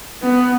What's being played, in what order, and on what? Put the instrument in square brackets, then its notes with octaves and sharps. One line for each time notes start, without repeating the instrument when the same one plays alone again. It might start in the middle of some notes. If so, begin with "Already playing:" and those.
[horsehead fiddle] B3